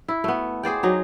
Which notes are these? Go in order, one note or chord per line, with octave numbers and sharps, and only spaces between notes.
E4
A3 B3
G#4 C5 D5 G5
F#3 D#4